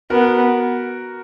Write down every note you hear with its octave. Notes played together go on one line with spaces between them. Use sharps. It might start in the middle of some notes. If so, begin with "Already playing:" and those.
B3 F#4 A#4